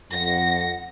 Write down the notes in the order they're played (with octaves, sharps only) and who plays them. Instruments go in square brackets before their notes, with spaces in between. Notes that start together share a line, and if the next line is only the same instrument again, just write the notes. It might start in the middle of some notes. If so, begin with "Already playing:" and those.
[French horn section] F2 [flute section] F#5 [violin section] A#6